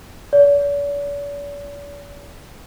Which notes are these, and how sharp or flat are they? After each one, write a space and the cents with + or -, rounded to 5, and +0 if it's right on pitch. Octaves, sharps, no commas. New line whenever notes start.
D5 -45